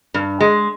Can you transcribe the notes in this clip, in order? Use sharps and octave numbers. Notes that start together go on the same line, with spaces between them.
G2
G#3